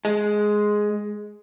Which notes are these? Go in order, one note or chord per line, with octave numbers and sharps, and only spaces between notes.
G#3